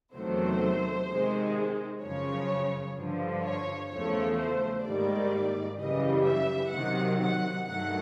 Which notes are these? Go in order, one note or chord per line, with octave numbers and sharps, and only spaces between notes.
E2 C3 D#3 F#3 A3 C5
C3 D#3 G#3
F#2 C#3 F3 C#5
G2 D3 F3
C#5
E2 C#3 F3 A3 C#5
C5
G#2 D#3 G3 A#3 D5
F#2 C#3 E3 G3 D#5
E5
C3 D#3 F#3 F#5
F#5
G2 D#3 F#3 A3 F#5